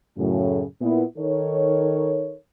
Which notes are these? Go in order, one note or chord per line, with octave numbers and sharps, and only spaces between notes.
F#2 A2 C#3
A#2 B3 E4
D#3 D#4 A4 A#4 C#5